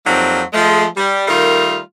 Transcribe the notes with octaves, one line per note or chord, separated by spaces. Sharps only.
F2 F#3 G3 A#3 C4 D#4
F3 G#3 A3
G3
D#3 G3 A3 D#4 F4 A#4